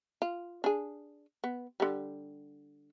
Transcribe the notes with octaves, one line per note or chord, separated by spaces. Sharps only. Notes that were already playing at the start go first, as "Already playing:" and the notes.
F4
D4 G#4
B3
D3 G3